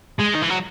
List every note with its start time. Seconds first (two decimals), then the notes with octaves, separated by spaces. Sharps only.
0.20 G#3
0.35 D#3
0.42 E3
0.50 F#3